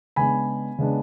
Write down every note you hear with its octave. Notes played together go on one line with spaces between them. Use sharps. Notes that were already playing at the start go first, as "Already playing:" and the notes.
C#3 G#3 B3 D4 G#5 B5
C#3 G#3 B3 D4